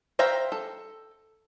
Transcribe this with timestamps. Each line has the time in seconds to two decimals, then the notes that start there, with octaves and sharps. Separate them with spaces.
0.19 C5 E5 F5 G5 A#5
0.52 A4